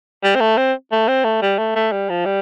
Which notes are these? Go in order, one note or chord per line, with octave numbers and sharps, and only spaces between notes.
G3
C4
A3
C4
A3
C4
A3
G3
A3
A3
G3
F3
G3